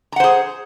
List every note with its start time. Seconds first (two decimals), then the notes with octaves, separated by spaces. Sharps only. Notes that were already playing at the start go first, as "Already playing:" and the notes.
0.12 A#5
0.16 F#5
0.20 C5
0.24 G#4